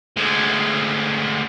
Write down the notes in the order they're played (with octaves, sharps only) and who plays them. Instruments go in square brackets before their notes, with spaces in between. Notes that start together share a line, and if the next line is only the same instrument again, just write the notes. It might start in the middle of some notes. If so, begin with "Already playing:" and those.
[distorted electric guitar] D2 G#3